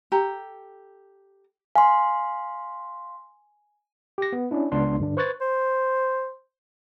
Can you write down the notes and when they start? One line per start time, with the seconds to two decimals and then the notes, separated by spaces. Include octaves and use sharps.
0.12 G4 A4 A#5
1.76 F5 G#5 C6
4.18 G4 A#6
4.32 B3
4.51 C#4 D4 E4
4.72 C#2 B3 D4 C6
5.00 G2 D3 D4
5.17 B4 C5 C#6 F#6 G#6 A6
5.41 C5